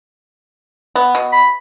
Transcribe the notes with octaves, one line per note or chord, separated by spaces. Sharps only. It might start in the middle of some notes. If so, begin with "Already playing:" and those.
B3
B2
B5